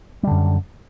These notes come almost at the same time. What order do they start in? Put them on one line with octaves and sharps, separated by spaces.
G3 D3 F#2